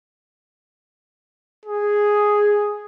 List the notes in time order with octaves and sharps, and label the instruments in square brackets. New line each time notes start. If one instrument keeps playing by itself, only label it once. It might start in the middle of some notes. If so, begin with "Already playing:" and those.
[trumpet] G#4